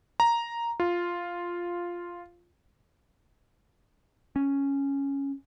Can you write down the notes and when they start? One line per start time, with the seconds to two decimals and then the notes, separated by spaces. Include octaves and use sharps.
0.20 A#5
0.80 F4
4.36 C#4